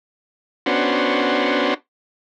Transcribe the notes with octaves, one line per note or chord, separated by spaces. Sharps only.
B3 C#4 D4 F#4 C5